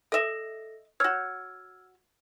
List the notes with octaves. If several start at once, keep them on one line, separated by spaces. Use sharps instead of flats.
A4 D#5 E5 A#6
F#4 C#5 E6 F6 G#6